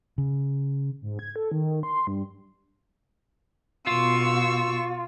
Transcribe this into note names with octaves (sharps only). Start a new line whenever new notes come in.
C#3
G#2
G#6
A4
D#3
C6
G2
B2 F4 C#6 E6